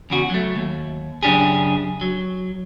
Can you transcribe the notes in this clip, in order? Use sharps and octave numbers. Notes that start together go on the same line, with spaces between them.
E2 C#3 F#4
F#3 A3
D#2
F#2 C#3 D4 G4 G#4
F#3